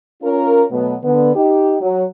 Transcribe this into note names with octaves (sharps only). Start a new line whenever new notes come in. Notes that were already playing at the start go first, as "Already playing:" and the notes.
C#4 F4 A#4
B2 F#3 A3 B3
D3 B3
D#4 G4
F#3